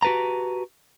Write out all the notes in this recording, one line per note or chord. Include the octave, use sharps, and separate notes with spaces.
F#4 G4 B4 A5 A#5